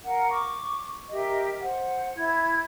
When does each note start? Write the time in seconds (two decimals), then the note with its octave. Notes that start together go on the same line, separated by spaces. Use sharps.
0.03 A#4 F5 F#5
0.29 C#6 D6
1.11 G4 A#4 D#5 E5
1.59 C5 F#5
2.15 E4 G#6